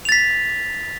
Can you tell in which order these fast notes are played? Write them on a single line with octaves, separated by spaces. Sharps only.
F7 A6 B6